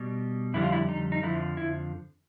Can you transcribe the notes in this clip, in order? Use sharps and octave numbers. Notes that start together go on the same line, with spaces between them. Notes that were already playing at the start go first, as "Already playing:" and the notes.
Already playing: B2 G3
F2 D3 G3 E4
F4
E4
D#4
D#4
F2 D3 F3 E4
E4